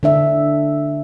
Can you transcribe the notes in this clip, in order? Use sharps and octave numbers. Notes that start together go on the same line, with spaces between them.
D3 D4 E5